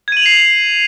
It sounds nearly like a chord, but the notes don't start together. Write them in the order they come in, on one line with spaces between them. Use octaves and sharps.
G#6 D#7 F#7 F7 C7